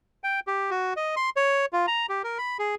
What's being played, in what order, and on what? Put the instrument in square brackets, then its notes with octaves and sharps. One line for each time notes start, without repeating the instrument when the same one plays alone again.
[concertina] G5
G4
F#4
D#5
C6
C#5
F4
A#5
G4
A#4
B5
G#4